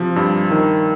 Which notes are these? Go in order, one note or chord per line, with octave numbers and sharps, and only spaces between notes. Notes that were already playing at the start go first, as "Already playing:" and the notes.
Already playing: C3 F3
G2
D#3